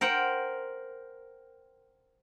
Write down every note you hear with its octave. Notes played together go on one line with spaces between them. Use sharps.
A#4 C5 F#5 G5